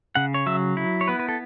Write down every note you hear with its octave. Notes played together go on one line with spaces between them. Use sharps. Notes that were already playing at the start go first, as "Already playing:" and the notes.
C#3 F#5
C#5
F#3 E5
E4
C#5
B3 B4
B4
A4